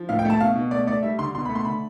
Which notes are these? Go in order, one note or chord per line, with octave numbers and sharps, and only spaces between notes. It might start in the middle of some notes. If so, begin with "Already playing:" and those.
Already playing: F3
A2 F5
G5
A3 A5
B2 F5
B2
A3 D5
A3 D5
G3 E5
D3 C6
B2 C6
B5
A3
C6
D3 B5